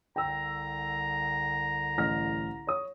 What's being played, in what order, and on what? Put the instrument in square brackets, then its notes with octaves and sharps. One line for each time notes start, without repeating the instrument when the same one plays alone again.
[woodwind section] C2 D3 A#5 [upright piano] G5 E6
[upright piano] A1 F6 A#6
C#5 D#6